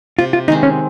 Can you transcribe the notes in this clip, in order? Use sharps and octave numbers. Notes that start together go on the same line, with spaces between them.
C3 F4
F4
D#3 G#3 C4 D#4
C#4